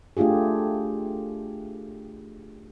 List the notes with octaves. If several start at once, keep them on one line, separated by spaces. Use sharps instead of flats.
A3 D4 F4 G4 G#4